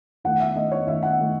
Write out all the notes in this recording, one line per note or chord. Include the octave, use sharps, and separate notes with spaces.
D#3 A3 F#5
E5
D#3 A3 D#5
C#5
D#3 A3 E5
F#5
D#3 A3